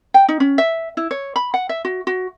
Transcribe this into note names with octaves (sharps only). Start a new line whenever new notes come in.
G5
D#4
C#4
E5
E4
C#5
B5
F#5
E5
F#4
F#4